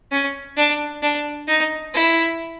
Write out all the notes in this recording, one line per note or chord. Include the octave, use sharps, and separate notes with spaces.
C#4
D4
D4
D#4
E4